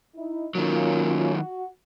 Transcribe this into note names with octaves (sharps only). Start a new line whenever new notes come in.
D#4 E4
D#3 F#3 A#3 C#4 F4
F#4